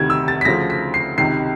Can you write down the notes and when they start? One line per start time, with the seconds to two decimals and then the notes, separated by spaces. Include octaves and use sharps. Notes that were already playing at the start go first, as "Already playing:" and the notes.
Already playing: D2 C3 D#3 G#6
0.10 E6
0.28 A6
0.41 B6
0.45 D2 C#3 F3 A#6
0.70 B6
0.94 C7
1.17 C#2 C3 D#3 C7